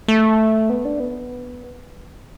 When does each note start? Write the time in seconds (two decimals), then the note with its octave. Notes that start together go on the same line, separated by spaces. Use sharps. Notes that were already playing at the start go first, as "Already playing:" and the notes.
0.08 A3
0.70 B3
0.85 D4
1.00 B3